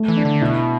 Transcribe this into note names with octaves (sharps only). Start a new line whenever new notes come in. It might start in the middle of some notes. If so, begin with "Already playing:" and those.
Already playing: A3
E3
D4
D3
B2 E4